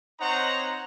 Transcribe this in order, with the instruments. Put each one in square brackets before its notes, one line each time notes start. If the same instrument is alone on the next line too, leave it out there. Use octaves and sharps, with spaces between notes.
[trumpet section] C4 D#4 C5 C#5 F#5 A#5